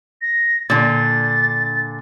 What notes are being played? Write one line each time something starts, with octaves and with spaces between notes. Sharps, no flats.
A#6
A#2 D3 A6